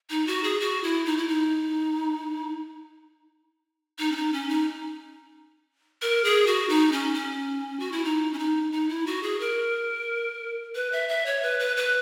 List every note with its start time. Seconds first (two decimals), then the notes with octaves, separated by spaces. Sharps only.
0.10 D#4
0.27 F#4
0.44 G#4
0.60 F#4
0.83 E4
1.05 D#4
1.17 E4
1.28 D#4
3.99 D#4
4.12 C#4
4.16 D#4
4.33 C#4
4.49 D#4
6.02 A#4
6.24 G#4
6.47 F#4
6.69 D#4
6.92 C#4
7.14 C#4
7.79 F#4
7.92 E4
8.04 D#4
8.33 C#4
8.39 D#4
8.72 D#4
8.89 E4
9.07 F#4
9.23 G#4
9.40 A#4
10.75 B4
10.92 E5
11.08 E5
11.26 C#5
11.42 B4
11.59 B4
11.76 B4